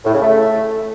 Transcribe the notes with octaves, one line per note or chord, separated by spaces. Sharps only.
A2
C#3
A3